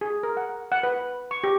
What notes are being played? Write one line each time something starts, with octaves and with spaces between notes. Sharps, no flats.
G#4
A#4
F#5
F#5
B4
C#6
G4